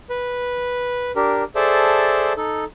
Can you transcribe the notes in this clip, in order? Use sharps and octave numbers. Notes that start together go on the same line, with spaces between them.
B4
D4 G4 A#4
G#4 A4 C5 D5 E5 A5
D#4 A4